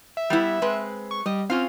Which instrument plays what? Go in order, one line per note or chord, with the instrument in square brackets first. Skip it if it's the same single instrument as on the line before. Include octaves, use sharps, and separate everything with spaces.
[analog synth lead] E5
[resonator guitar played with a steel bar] G3 B3 E4
G#3 C4 B4
[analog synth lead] C#6
[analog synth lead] G3 [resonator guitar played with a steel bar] D#5
[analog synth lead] C4 [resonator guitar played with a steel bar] C#4 F4 F5